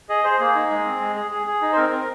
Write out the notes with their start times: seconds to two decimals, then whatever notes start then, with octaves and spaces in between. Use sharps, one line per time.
0.09 G#4 D#5
0.24 G#4 C5
0.40 A#3 G#4
0.55 D#4
0.70 G#3
0.85 C4
1.01 G#3
1.16 G#4
1.31 G#4
1.47 G#4
1.62 D#4
1.72 C5
1.77 C4 A#4
1.92 C4